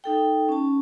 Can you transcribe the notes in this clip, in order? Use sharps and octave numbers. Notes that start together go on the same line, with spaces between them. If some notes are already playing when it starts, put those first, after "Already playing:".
D#4 A4 G5
C#4 A5